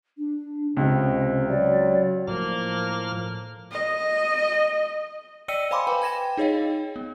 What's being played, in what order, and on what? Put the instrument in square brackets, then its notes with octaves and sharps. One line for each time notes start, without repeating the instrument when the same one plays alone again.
[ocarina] D4
[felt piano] C#2 [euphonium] C3 [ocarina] D#5
[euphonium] F#3 [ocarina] D5
[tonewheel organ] A2 F3 F6 [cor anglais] A#3
[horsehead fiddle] D#5
[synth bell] D5 D#5 G5 E6 C#7 D#7
C5 F5 G#5 B5 C6 D6
B4 G5 B5
G5 G#6 A#6 E7
D#4 G#4 C#5 D#5 F5 G5
B3